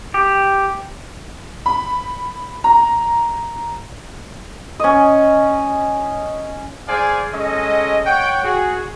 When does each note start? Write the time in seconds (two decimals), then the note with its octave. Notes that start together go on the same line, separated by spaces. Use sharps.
0.14 G4
1.66 B5
2.64 A#5
4.80 C#4 D#5
6.88 G#4 C5 D5 F5 G#5
7.34 G#3 C#4 A4 D#5
8.05 C#5 F#5 G5
8.44 F#4 G#4